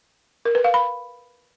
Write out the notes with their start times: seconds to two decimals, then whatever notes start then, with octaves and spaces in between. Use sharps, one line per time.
0.45 A#4
0.55 B4
0.64 F5
0.74 B5